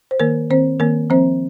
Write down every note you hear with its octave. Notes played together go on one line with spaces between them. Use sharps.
C5
D#3 A#3 A#4
D#3 C4 C5
D#3 A#3 A#4
F3 C4 C5